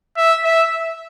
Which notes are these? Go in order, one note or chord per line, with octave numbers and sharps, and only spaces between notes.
E5
E5